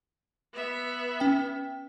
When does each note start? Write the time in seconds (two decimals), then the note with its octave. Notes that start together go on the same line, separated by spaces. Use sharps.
0.53 B3 E5
1.20 C#4 G5